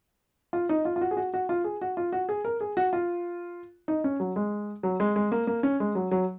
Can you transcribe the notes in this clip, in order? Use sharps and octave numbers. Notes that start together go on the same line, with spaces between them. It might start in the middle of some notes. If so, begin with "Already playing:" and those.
F4
D#4
F4
F4
F#4
G#4
F#4
F#4
F4
G#4
F#4
F4
F#4
G#4
A#4
G#4
F#4
F4
D#4
C#4
F#3
G#3
F#3
G#3
G#3
A#3
A#3
C#4
G#3
F#3
F#3